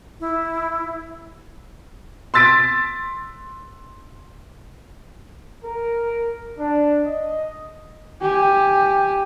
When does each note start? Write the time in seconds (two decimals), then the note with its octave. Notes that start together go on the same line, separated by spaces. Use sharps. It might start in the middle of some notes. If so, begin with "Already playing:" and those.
0.20 E4
2.34 C6 E6 A6 B6 D7
5.65 A#4
6.59 D4
7.05 D#5
8.21 G4 G#5